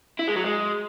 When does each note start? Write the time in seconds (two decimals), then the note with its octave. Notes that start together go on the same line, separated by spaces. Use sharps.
0.19 E4
0.28 G#3
0.36 F#3
0.44 G#3